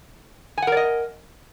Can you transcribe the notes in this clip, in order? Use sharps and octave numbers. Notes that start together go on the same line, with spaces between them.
A#4 D5 D#5 F#5 G#5